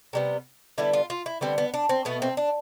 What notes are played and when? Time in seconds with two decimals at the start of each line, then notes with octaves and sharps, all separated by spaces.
0.13 C3 G3 B3
0.78 D3 G3 B3 E4
0.93 F4
1.10 F4
1.26 E4
1.41 D3 G3 B3 C4
1.58 B3
1.74 D4
1.89 C4
2.05 B2 A3 B3
2.22 C4
2.37 D4